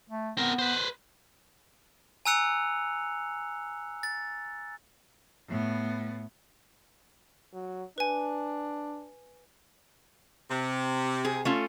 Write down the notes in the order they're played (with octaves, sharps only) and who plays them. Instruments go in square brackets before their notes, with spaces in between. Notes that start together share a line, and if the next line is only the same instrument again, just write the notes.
[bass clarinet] A3
[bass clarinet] B3 [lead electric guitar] C4 A#4
[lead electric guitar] B4 C5
[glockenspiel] G#5 A#5 E6 F#6 C#7 F7
A6
[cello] A2 B3
[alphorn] F#3
[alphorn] D4 [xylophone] B4 G#5
[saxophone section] C3
[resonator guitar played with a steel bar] G#4
A3 C#4 F4